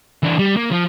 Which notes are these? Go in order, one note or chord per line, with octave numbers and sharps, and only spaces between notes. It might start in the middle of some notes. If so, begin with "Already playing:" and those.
E3 D4
G3
A#3
F3